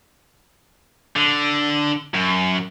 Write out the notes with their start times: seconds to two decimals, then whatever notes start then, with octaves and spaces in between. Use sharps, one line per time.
1.16 D3
2.14 F#2